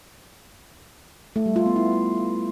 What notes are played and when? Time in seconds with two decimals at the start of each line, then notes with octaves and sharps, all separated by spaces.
1.36 A3
1.46 G3
1.56 F4
1.66 B3
1.76 E4